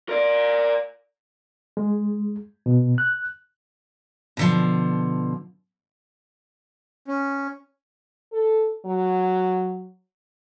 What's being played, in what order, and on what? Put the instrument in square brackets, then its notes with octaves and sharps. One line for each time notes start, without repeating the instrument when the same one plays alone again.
[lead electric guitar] A#4 D5
[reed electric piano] G#3
B2
F#6
[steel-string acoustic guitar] B2 D3 F3
[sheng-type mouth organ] C#4
[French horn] A4
F#3